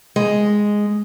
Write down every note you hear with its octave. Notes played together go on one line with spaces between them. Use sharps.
G#3